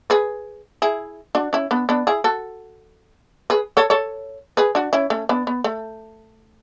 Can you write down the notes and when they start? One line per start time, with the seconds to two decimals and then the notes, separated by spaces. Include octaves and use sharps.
0.10 G#4 B4
0.82 E4 G#4
1.35 D4 F#4
1.53 C#4 E4
1.71 B3 D4
1.89 B3 D4
2.07 E4 G#4
2.24 F#4 A4
3.50 G#4 B4
3.77 A4 C#5
3.90 A4 C#5
4.57 G#4 B4
4.75 D4 F#4
4.93 C#4 E4
5.10 A3 C#4
5.29 B3 D4
5.47 B3
5.64 A3